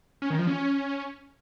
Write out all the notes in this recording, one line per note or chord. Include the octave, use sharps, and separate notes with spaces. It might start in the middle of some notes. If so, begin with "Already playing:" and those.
C#4
D#3
F3
C#4